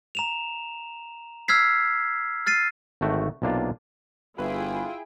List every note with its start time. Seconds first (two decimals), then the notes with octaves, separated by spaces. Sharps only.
0.15 A#5 E7 F7
1.48 E6 F6 G#6 B6 C7
2.46 F6 A6 C7 D#7
3.01 G#1 D3 A3 F#4 G5
3.42 B1 C3 A#3 D4 F4
4.38 G1 E4 F4 G#4 B4 G5